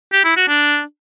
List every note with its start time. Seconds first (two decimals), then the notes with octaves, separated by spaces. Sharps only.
0.13 G4
0.24 E4
0.36 F#4
0.48 D4